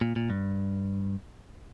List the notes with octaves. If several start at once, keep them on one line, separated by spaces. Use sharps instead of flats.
A#2
A#2
G2